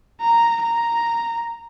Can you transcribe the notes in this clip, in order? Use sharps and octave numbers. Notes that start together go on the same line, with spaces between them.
A#5
A#5